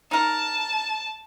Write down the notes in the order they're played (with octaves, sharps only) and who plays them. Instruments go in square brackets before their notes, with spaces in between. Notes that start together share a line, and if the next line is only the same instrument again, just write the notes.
[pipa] D#4 A#4 [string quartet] A5